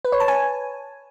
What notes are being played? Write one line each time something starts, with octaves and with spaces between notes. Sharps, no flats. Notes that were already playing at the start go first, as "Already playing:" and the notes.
B4
C#5
A5
G#5